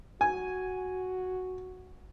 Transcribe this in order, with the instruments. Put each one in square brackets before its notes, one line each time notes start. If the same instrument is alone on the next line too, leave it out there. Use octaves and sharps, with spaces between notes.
[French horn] F#4 [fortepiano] G#5